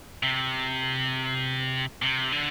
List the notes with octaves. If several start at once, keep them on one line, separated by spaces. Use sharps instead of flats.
C3
C3
D3